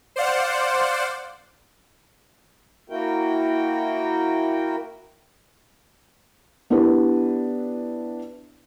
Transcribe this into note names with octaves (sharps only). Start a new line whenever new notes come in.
C5 D5 F5 F#5
A#3 E4 F#4 A#4 G5
B3 D4 E4 G4 B4